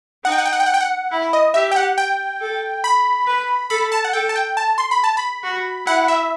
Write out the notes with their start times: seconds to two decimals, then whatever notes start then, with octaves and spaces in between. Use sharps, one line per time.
0.25 D#4 F#5
0.32 G5
0.38 F#5
0.46 G5
0.53 F#5
0.60 G5
0.66 F#5
0.74 G5
0.81 F#5
1.12 E4
1.33 D#5
1.54 G4 E5
1.71 G5
1.76 F#5
1.98 G5
2.41 A4
2.84 B5
3.27 B4
3.70 A4 B5
3.92 A5
4.05 F#5
4.13 A4 G5
4.29 A5
4.36 G5
4.57 A5
4.78 C6
4.91 B5
5.04 A5
5.17 B5
5.43 F#4
5.86 E4 F#5
6.08 E5